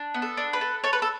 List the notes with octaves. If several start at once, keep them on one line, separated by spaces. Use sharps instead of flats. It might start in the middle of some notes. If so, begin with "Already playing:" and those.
Already playing: D4
B3
A4
D4
B4
A4
A4 C#5
B4
A4